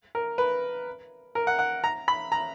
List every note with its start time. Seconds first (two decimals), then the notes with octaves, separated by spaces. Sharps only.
0.15 A#4
0.38 B4
1.35 A#4
1.47 F#5
1.59 F#5
1.84 A#5
2.08 B5
2.32 A#5